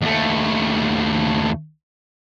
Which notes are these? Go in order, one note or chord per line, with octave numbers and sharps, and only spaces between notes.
D#2 A3